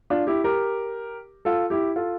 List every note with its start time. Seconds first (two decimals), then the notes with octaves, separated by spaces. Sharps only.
0.10 D4 F4
0.27 E4 G4
0.44 G4 A#4
1.45 F4 A4
1.70 E4 G4
1.96 F4 A4